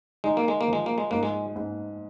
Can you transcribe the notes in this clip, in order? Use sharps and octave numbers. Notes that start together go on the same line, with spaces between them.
G#3 D#4
A#3
G#3
A#3
F3 G#3
A#3
G#3
G#2 A#3
G#3
G#2